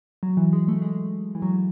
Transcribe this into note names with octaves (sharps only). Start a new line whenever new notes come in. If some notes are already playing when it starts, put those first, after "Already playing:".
F#3
E3
G#3
A3
G#3
E3
F#3